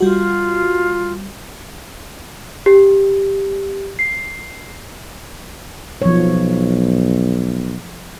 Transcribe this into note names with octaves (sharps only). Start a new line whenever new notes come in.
G3 F4 F#4
G4
C7
B1 F3 C#5